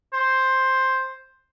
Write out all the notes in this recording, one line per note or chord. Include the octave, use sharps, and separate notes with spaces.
C5